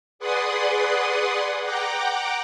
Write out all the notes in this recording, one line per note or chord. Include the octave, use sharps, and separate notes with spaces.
G#4 B4 D5 F#5 C6 D#6
F#5 G5 A#5 D6